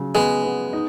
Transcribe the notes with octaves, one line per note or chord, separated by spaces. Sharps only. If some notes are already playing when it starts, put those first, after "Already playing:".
Already playing: C#3 F#3
G#3 B3
B3
D#4